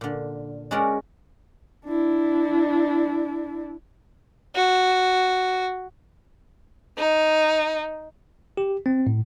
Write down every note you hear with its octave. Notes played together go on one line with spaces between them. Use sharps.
A#2 D3
G#3 C#4 F#4 A#4 D5 F#5
D4 E4
F#4
D#4
G4
C4
A2